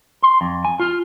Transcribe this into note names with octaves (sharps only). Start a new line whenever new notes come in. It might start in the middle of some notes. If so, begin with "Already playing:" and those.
C6
F2
G#5
F4